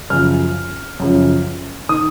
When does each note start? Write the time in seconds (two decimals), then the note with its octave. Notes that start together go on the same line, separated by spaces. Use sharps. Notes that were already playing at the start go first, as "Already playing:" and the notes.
0.10 F#2 C#3 F3 F6
1.00 F#2 C#3 F3
1.89 D#3 D#6